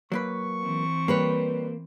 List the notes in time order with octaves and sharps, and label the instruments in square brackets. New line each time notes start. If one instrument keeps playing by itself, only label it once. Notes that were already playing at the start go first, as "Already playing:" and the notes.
[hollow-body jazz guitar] F#3 A#3 B4 [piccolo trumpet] C#6
[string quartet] E3 C4
[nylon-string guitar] G3 B4 C#5 [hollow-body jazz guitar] A#3